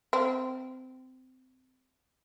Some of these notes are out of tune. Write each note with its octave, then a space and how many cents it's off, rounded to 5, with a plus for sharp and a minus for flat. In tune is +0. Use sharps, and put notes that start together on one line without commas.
C4 -20